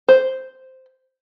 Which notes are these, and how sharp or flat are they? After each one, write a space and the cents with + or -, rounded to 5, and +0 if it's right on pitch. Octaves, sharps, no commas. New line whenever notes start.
C5 -5